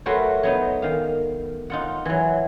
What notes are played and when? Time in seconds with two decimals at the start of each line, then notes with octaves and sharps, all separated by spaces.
0.06 F#3 A3 F#4 A#4 B4 C6
0.43 F#3 B3 D#4
0.82 D#3 F5
1.70 D#4 F4 F#5
2.05 E3 F#3